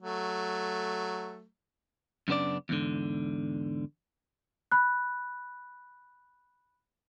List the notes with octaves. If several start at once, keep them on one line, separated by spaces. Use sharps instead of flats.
F#3 A3
F#2 C#3 B3 D4 D5
E2 G#2 D3
B5 F#6